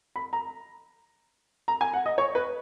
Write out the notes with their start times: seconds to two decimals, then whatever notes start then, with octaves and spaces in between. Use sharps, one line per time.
0.16 B5
0.33 A#5
1.68 A#5
1.81 G#5
1.93 F#5
2.06 D#5
2.18 C#5
2.35 B4